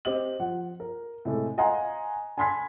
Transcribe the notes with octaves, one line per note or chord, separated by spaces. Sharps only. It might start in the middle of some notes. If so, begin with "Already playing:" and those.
C4 G4 D#5 F#7
F3 F#5
A#4
A2 C3 G#3 A4
D#5 F5 F#5 G#5 A#5 C6
G#5 A5 B5 C6 G#6 B6